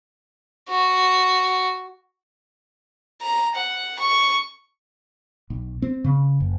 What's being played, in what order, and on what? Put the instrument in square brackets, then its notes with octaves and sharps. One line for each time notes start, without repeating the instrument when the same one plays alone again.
[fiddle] F#4
A#5
F#5
C#6
[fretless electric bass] B1
C4
C#3
F#1